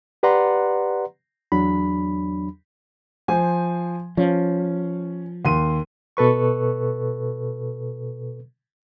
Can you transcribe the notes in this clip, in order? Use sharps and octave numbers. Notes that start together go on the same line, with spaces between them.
G4 B4 D5 F#5 A#5 C6
E2 F#3 D4 B5
F3 C5 G#5
F3 C#4
D#2 C6 D#7
B2 A4 B4 C#6